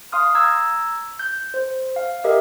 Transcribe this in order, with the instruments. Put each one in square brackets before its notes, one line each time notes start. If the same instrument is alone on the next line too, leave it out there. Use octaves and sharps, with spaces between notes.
[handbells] F5 C6 D#6 F6
A#5 E6 G#6
G6
C5
F5
G4 A#4 D#5 E5